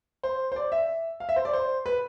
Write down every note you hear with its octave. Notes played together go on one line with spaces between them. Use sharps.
C5
C5
D5
E5
F5
E5
C5
D5
C5
B4